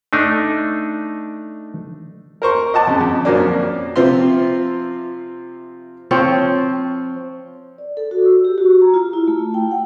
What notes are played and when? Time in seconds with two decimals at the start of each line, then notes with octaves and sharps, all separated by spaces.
0.13 A3 D4 D#4
2.42 A#4 C5 C#6
2.74 D#5 F#5 A5 D6
2.87 F2 C#3
3.01 F2
3.25 F2 F3 F#3 A#3 C#4 D4
3.96 C3 F3 C4 F4 E5 C6
6.11 F3 C4 C#5
7.78 D5
7.97 A4
8.11 F#4
8.26 E6
8.45 G4
8.58 F#4
8.82 A#5
8.94 F4
9.13 E4
9.28 A3
9.54 G5
9.71 F#5